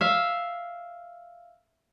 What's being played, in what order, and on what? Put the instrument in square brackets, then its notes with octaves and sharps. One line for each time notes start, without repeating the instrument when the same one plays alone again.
[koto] E5 F5